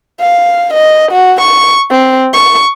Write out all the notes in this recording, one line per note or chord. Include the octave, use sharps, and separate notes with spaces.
F5
D#5
F#4
C#6
C4
C#6